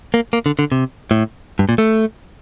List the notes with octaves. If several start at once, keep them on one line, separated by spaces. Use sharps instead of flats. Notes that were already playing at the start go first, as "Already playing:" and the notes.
A#3
A#3
D3
D3
C3
A2
G2
A#2
A3